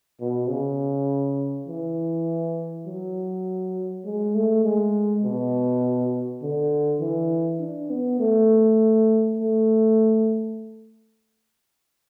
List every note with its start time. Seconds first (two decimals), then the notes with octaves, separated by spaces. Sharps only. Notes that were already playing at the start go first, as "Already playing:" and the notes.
0.20 B2
0.49 C#3
1.67 E3
2.86 F#3
4.05 G#3
4.35 A3
4.64 G#3
5.23 B2
6.42 D3
7.00 E3
7.60 D4
7.90 B3
8.19 A3
9.37 A3